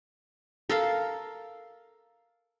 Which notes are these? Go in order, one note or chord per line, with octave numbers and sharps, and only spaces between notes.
A4 A#4 F5